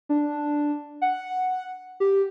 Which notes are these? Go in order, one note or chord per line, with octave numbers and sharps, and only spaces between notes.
D4
F#5
G4